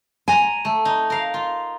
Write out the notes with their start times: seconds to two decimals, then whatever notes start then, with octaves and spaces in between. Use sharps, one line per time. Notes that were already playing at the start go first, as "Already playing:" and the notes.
0.28 G#5 A#5 C6
0.65 A3
0.85 D#4
1.10 A#4 F5
1.34 F4